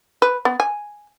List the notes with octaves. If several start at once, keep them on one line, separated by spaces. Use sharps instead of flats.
B4
B3
G#5